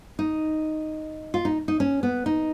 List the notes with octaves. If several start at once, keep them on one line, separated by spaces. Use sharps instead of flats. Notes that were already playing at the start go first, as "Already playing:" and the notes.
D#4
F4
D#4
D#4
C#4
B3
D#4